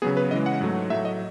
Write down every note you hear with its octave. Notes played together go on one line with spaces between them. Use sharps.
C#3 F#3 B3 G#4
B4
C#3 E3 G#3 D#5
F#5
G#2 F#3 A3
A2 F#3 A3 E5
D#5